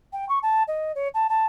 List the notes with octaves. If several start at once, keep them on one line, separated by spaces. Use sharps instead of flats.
G5
C#6
A5
D#5
C#5
A5
A5